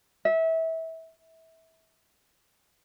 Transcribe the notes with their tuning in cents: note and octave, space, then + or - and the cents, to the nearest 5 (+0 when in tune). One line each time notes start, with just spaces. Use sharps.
E5 -25